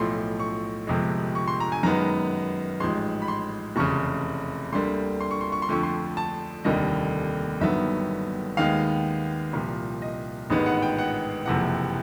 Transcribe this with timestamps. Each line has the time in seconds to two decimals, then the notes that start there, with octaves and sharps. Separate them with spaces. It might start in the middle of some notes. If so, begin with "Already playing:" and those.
Already playing: B1 A2 F3 A3 C6
0.40 C#6
0.87 G1 F2 C3 F3 G#3
1.35 C#6
1.48 C6
1.60 A#5
1.72 G#5
1.83 F#2 D#3 G#3 B3 A#5
2.80 A1 G#2 F3 G#3 C6
3.22 B5
3.28 C6
3.76 F1 E2 C#3 C#6
4.73 D2 D3 G3 A#3 C6
5.20 C6
5.31 C#6
5.41 C6
5.52 C#6
5.62 C6
5.69 F2 D3 F3 A3 C#6
5.83 C6
6.17 A5
6.64 F1 D#2 D3 G3 A#3 D#5
7.61 G1 G2 D#3 F#3 B3 E5
8.57 D#2 D#3 G#3 B3 F5
9.53 C2 A#2 F3
10.02 D#5
10.50 A1 G#2 D#3 G#3 B3
10.66 F#5
10.82 G5
10.99 F#5
11.46 F#1 F2 C3 E3 F#5